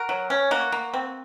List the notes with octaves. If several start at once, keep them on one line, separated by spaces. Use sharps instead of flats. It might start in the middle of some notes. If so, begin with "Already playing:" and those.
Already playing: F#4 A#4
F#3
C#4
A#3 F#4
A#3
C4